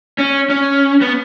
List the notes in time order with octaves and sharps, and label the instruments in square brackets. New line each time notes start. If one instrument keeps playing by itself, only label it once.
[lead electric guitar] C#4
C#4
B3